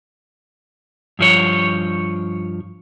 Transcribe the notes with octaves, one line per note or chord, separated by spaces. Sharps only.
G2 F3 C#5